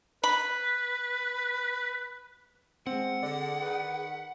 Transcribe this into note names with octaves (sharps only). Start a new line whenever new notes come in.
B4 B5
G#3 C4 F#5
D3 G#4 D5
D#3 B4